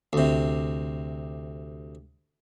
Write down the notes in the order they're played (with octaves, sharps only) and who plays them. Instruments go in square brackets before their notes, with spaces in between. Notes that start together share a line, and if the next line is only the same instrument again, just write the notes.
[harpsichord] D2 C3